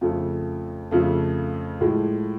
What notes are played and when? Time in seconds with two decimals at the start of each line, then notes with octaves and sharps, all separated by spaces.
0.01 F2 C#3 F3 A3
0.91 F2 C#3 F3 A3
1.81 A2 F3 G#3